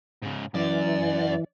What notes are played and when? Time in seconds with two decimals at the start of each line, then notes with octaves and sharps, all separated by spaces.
0.23 G#2 C#3
0.55 F#2 E3 D5